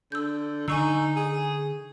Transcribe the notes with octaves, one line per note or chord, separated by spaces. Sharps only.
D3 E6 G6
D3 D#4 G#5 C#6 E6
G#4